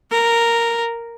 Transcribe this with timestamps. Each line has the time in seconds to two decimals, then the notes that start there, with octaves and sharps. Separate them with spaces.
0.11 A#4